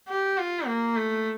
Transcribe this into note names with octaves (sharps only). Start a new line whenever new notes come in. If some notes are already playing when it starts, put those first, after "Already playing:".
G4
F4
A#3
A3